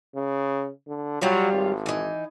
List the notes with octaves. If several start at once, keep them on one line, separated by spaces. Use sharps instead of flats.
C#3
D3
F#3 G3 F4 C#5
G#1
E3 D#4